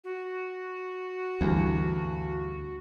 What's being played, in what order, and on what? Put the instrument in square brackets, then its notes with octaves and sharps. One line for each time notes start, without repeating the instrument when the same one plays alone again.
[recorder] F#4
[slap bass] D2 [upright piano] G2 E3